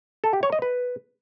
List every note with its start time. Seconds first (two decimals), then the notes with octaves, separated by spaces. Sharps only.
0.24 A4
0.33 G4
0.43 C#5
0.52 D#5
0.62 B4